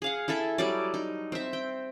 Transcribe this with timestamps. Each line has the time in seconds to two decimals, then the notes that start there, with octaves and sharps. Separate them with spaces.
0.02 G#4 F5 F#5
0.28 E4 G#4 A4 E5
0.58 F#3 G3 D5
0.94 D#4
1.32 C4 E5
1.53 G5